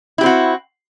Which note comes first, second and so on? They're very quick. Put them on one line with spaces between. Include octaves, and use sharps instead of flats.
E4 G4 C4 F#4